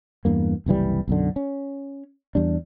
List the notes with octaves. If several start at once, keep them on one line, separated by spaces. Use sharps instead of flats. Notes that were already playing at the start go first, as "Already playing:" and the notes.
E2 G2 A#3
F#1 C2 E3 G3
B1 F#2 D3
C#4
E2 G3 D4